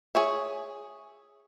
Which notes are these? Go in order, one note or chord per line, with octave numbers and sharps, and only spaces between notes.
G#4 C#5 E5